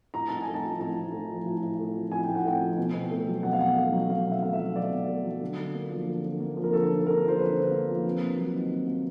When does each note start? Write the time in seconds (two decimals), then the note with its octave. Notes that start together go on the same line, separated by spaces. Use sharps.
0.14 A2 A#5
0.28 A2 A5
0.41 G#5
0.47 A3
0.54 A5
0.64 F3
0.79 A2 A5
0.97 A2
1.12 A3
1.29 F3
1.46 A2
1.63 A2
1.79 A3
1.95 F3
2.11 A2 G#5
2.24 A2 G5
2.35 F#5
2.45 A3 G5
2.62 F3
2.78 B2
2.94 B2
3.11 A3
3.27 F#3
3.43 B2 F#5
3.53 F5
3.60 B2 F#5
3.77 A3
3.92 F#3
4.09 B2 F5
4.26 B2
4.31 E5
4.42 A3 F5
4.53 E5
4.59 F#3
4.76 B2 D5
4.92 B2
5.09 A3
5.24 F#3
5.41 D3
5.58 D3
5.75 A#3
5.90 F3
6.07 D3
6.24 D3
6.40 A#3
6.57 F3
6.64 A#4
6.73 D3 A4
6.89 D3
7.00 A4
7.07 A#3 A#4
7.22 F3
7.28 C5
7.39 D3 B4
7.56 D3
7.71 A#3
7.89 F3
8.05 C3
8.22 A#3
8.38 F#3
8.54 D#3
8.71 C3
8.87 A#3